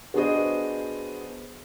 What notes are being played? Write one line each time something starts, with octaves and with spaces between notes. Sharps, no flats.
B3 D4 F#4 G#4 C5 D#5